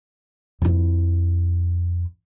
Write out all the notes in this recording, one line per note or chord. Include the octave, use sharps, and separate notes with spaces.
F2 E4